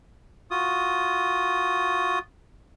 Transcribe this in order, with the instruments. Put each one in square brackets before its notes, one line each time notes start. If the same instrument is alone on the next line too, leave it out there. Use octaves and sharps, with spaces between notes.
[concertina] F4 F#4 D#6